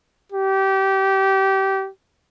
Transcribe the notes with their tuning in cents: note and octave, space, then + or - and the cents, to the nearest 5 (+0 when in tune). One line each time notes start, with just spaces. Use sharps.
G4 -25